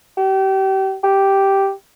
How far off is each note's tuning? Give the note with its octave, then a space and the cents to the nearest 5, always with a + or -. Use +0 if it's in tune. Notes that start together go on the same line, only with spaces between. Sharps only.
G4 -30
G4 -5